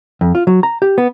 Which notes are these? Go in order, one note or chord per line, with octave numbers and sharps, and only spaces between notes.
F2
F4
F#3
A#5
G4
B3